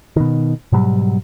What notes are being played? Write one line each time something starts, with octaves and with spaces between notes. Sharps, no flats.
B2 D#3
G#2 B2 F#3 G3